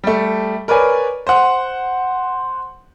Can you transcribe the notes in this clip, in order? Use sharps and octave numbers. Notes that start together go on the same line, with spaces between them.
G3 A3
A#4 B4 C#5 D5 G#5
C5 F#5